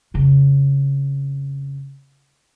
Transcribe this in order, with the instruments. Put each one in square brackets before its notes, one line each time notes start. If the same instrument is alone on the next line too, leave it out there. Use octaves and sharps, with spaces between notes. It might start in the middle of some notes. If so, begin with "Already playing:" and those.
[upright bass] F2 C#3